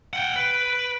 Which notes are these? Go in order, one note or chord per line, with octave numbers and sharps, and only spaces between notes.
F#5 G5
B4 D7